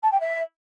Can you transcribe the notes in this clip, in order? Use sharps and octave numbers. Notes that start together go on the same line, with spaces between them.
A5
G5
E5